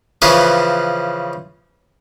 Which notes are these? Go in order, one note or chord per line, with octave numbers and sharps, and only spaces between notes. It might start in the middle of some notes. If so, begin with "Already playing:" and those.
C#3 E3 F3 C#4 B4 C5